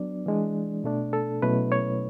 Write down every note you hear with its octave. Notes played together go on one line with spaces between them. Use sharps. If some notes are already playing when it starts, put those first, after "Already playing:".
Already playing: F#3 B3 D4 D5
E3 G#3 D4
B2 A3 D4
A4
B2 F#3 A3 C#4 E4 B4
C#5